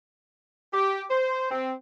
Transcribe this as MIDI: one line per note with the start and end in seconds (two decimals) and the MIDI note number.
0.74 1.04 67
1.11 1.51 72
1.51 1.73 60